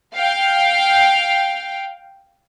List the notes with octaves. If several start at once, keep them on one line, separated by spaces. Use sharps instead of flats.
F5 G5